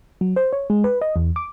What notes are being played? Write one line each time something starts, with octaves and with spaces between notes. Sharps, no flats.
F#3
C5
C#5
G#3
B4
D#5
E2
D6